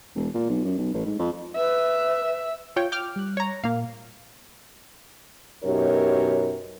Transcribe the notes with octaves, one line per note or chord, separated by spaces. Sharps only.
E1
A#2
B1
F#2
B1
A1
G#2
F2
B4 E5
F4 C#5 G5
G5 D6 F6
G3 F#6
C#5 A#5
A#2 A#3 F5
F#2 B2 D#4 G4 A#4 C#5